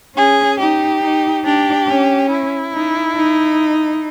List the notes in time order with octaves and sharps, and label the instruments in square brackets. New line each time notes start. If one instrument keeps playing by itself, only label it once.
[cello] C#4 [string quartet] G#4
[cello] D#4 [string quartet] G4
[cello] D#4
[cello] D4 [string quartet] G4
[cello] C#4
[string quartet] E4
[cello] D#4
D#4